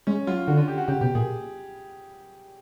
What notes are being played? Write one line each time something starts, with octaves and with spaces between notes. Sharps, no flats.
G#3 C#4
F#3 F4
D3 F#4
F4
G4
F#4
C#3 G4
B2 G4
A#2 G#4